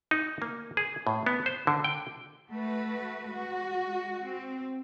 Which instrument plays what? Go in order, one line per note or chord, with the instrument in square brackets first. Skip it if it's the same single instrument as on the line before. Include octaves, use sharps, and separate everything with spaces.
[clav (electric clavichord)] D#4
A#3
G#4
A2
B3
C5
D3
G5
[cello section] A3 F#4 B4
G#3 F#4
C4